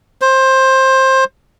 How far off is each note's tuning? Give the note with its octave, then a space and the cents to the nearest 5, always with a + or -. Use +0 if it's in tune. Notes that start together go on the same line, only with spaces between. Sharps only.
C5 +15